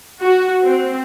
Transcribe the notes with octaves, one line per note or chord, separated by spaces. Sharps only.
F#4
C4